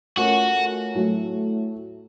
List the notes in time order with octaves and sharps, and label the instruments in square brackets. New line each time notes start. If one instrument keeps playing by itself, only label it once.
[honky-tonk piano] A3 C#4 F4 A#4 [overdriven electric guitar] F#4
[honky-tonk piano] A2 F#3 A3